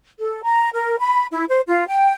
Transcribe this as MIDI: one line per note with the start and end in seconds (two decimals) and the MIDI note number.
0.20 0.42 69
0.44 0.68 82
0.74 0.98 70
0.99 1.25 83
1.31 1.44 64
1.49 1.61 72
1.67 1.86 65
1.88 2.13 79